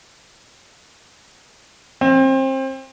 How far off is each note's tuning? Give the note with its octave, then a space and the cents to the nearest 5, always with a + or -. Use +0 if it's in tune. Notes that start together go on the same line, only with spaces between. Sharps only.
C4 +30